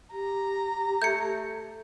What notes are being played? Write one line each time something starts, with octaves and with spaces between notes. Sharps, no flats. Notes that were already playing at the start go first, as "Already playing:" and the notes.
G4 A#5
A3 G6 G#6 C#7